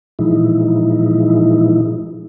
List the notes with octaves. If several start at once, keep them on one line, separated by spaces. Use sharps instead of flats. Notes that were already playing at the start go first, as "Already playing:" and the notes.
A#2 E3 F3 G#3 D#4 E4